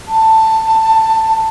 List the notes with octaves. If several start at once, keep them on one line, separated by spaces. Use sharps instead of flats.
A5